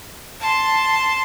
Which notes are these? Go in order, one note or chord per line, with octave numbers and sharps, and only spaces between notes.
A5 C6